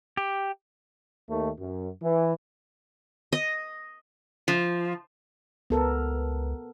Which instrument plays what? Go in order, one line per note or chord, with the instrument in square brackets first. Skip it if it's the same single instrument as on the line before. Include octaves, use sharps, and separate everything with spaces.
[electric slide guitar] G4
[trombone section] D#2 D#3 A3
F#2
E3
[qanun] D#5
[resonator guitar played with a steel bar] F3
[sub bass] C#2 [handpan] B3 A4 A#4